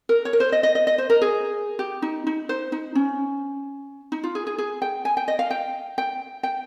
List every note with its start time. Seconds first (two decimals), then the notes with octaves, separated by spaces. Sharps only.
0.09 A#4
0.25 C#5
0.33 A#4
0.40 C5
0.52 D#5
0.63 D#5
0.75 D#5
0.87 D#5
0.98 C5
1.10 A#4
1.22 G#4
1.79 G4
2.02 D#4
2.27 D#4
2.49 C5
2.72 D#4
2.95 C#4
4.12 D#4
4.23 F4
4.35 G#4
4.47 G#4
4.58 G#4
4.82 G5
5.05 G#5
5.17 G5
5.28 D#5
5.39 F5
5.51 G5
5.98 G5
6.43 G5